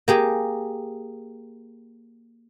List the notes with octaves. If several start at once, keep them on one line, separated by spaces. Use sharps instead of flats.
A#3 G4 G#4